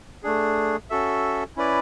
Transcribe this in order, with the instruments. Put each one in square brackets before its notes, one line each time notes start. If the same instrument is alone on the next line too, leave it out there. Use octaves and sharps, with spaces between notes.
[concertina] A3 D4 G#4
C#4 F#4 A4 E5
C#4 E4 B4 D5